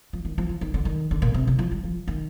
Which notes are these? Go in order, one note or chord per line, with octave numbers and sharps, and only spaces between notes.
F3
D#3
F3
F3
D#3
D3
D#3
D3
A#2
C3
D3
F3
G3
F3
D#3